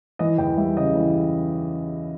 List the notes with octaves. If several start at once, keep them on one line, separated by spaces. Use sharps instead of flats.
E3 D#5
E2 G5
G3 E5
C#3 D#5
E3